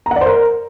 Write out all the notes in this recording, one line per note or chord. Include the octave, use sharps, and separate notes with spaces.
A#5
F#5
D5
C5
A#4